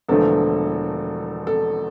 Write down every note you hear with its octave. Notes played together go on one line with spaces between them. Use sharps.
E1 E2 D3 F3 A3 A4
A4